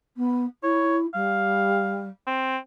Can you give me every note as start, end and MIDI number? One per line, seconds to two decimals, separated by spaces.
0.16 0.45 59
0.63 1.06 64
0.63 0.97 73
1.14 2.08 55
1.14 2.09 77
2.27 2.57 60